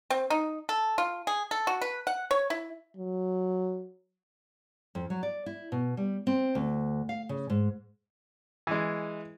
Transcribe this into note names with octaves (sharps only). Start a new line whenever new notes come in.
C4
D#4
A4
F4
G#4
A4
F#4
B4
F#5
C#5
E4
F#3
F2
F#3
D5
E4
B2
G3
C4
D2
F5
C#3
G#2
E3 G#3